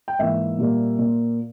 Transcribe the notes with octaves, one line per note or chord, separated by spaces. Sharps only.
G5
G#2 E3 A#3 E5
A#2 G3 A#3
A#2 A#3